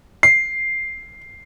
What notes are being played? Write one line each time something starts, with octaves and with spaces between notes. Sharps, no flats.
C7